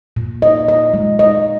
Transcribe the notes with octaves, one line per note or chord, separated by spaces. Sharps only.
A#2
D#5
D#5
G#3
D#5